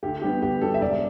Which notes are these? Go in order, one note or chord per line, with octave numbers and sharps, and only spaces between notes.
D2 G4
D3 G3 B3 G4
D2 G4
D3 G3 B3 A4
E5
E1 D5